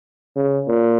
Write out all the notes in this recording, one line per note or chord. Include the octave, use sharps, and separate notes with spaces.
C#3
A#2